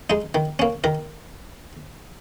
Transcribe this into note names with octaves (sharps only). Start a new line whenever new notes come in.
G#3 D#4
D#3
A#3 C#4
D#3 A#4